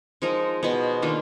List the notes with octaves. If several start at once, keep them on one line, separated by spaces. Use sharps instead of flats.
F3 G#3 D#4 A#4
B2 G#3 B3
D#3 A#3 D4 F4